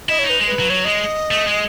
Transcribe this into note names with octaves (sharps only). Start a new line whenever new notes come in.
E4 D#5
D#4 C#5
B4
G#3
B4
F#3
F#3 C#5
G#3 D#5
A3
G#3